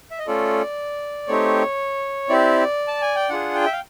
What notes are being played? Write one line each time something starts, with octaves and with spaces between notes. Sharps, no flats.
E5
D#5
A3 C#4 F4 A4 D5
A3 C4 D#4 G4 C#5
C4 E4 G4 D5
A5
G#5
G5
D4 F4 G#4 F#5
G5
E5
F5